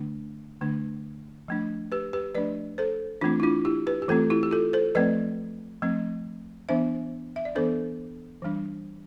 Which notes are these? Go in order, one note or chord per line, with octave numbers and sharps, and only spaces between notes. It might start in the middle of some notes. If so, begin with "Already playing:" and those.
Already playing: D3 A3 D4
D3 A3 D4
F3 A3 D4
G4 B4
G4 B4
F3 A3 D4 B4 D5
A4 C5
E3 A3 C4 D4 F4
E4
D4 F4
E4 G4
G4 B4
G4
E3 A3 C4 F4 A4
E4 G4
G4
F4 A4
A4 C5
F3 A3 C4 B4 D5
F3 A3 C4
E3 B3 D4 C5 E5
E5
D5
E3 B3 D4 A4 C5
E3 G3 D4